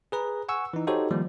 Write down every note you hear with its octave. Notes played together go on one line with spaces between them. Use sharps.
G#4 B4 A#5
F#5 G#5 C#6 E6
E3 D#4
D#4 F#4 G4 A4 C5 C#5
D#3 F3 G3 A#3